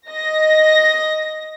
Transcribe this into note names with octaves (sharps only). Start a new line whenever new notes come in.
D#5 A#6